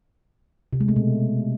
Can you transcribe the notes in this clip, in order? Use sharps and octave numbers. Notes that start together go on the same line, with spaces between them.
C3
G#3
A3
B2